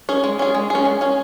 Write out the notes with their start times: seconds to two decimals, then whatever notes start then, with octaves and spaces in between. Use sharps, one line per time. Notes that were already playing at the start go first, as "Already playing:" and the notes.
0.09 C#4 G#4
0.24 G#3
0.39 C#4 G#4
0.55 G#3
0.70 C#4 G#4
0.85 G#3
1.01 C#4 G#4